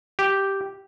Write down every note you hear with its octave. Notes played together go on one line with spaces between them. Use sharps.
G4